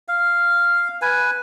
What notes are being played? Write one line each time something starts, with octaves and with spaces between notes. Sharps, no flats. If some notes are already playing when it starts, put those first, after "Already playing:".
F5
B4 G#5